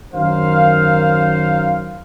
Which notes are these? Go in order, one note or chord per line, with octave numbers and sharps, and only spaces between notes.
F#2 D#3 A#4 C5 F5